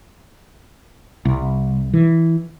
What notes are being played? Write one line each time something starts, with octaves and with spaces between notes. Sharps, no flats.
C2
E3